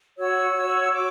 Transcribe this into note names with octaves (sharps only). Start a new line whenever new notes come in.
F#4 C#5 E6
F#4 C#5
F#4 D6